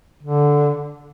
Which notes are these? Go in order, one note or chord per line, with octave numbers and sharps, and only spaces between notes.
D3